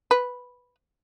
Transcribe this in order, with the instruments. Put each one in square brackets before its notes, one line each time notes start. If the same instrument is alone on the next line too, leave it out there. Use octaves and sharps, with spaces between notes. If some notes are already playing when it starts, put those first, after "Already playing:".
[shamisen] B4